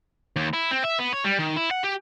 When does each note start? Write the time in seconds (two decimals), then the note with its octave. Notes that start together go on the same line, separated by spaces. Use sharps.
0.36 D#2
0.54 E4
0.71 C4
0.84 E5
0.99 B3
1.13 C#5
1.25 G3
1.39 D#3
1.57 E4
1.71 F#5
1.83 G4